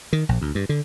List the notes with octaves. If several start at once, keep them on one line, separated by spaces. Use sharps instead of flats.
D#3
A#1
D2
G2
D3